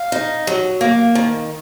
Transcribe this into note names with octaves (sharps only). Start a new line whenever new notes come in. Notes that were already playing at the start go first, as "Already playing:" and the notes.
Already playing: F5
D#4
F#3
A#3
D#3